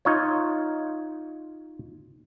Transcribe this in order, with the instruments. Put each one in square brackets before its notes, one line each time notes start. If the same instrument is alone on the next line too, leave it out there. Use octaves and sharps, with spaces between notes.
[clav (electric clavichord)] D#4 F4 C#5